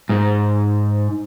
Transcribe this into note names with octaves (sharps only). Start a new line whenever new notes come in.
G#2